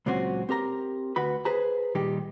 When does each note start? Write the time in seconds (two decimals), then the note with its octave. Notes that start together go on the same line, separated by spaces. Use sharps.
0.06 C#2 A#2 F#3 C4 C#4 F#4
0.49 C4 G4 A#4 A#5
1.16 D2 F#4 B4 B5
1.45 G#4 B4 C5 A#5
1.95 A#2 D#3 G3 D#4 G4